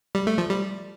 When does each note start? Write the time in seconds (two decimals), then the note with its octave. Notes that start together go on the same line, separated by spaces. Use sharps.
0.15 G3
0.27 A3
0.38 F3
0.50 G3